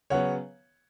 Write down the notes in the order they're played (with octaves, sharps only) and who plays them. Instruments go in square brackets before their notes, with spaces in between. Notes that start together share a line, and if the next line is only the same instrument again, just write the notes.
[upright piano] C#3 F#3 B3 C#5 F#5